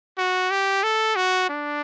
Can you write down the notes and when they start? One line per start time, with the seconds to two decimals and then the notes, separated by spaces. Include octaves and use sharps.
0.18 F#4
0.51 G4
0.83 A4
1.16 F#4
1.49 D4